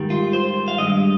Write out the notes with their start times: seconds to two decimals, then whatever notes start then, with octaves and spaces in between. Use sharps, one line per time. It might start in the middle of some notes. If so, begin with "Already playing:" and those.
Already playing: G#2 D#3 G3
0.10 F4
0.33 C5
0.68 F5
0.78 G2 F3 G#3 D#5